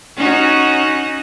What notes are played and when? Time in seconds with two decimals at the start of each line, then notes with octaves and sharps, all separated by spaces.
0.16 C#4 D#4 F#4